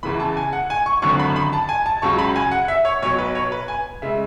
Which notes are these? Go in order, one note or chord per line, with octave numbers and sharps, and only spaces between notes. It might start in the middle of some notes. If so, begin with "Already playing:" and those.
E2 C#3 E3 B5
A5
G#5
F#5
G#5
C#6
G#1 F#2 D3 C#6
B5
B5
A5
G#5
A5
C#2 C#3 F#3 C#6
B5
G#5
F#5
E5
C#5
B1 B2 F#3 C#5
B4
C#5
B4
G#5
C#3 G#3 E5